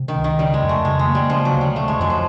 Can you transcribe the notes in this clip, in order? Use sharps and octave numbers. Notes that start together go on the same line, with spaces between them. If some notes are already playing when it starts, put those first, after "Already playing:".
Already playing: C3
D#3
C#2
D#3
C#3 G3
G#3
F2
A3
C#3 G#3
G#3
A#3
G3
C#3 F3
F#3
D2
G3
C3 A3
G#3
F2 F#3
F3